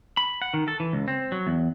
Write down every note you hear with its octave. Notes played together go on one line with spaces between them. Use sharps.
B5
F#5
D#3
A4
E3
C#2
C4
F#3
E2